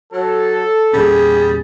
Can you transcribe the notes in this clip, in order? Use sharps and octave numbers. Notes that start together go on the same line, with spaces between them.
F#3 A4
E2 A#2 G3 C#4 G#4